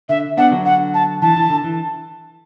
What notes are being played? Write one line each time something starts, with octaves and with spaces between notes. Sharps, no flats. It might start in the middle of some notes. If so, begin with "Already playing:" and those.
D3 E5
B3 D4 F#5
D3 F#3
F#5
A5
E3 A5
E3
D3
E3